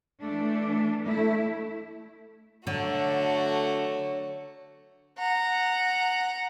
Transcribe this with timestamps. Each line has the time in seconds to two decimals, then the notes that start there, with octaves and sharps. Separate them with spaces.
0.23 E3 A3 D4
1.06 A3 E4
2.67 D3 F#3 A3 F#4
5.18 F#5 A#5